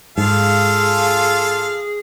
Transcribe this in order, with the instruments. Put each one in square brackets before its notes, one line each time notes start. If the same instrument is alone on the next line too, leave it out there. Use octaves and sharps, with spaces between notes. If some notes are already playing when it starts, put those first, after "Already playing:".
[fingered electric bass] G#2 [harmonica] F4 A4 F5 [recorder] G#4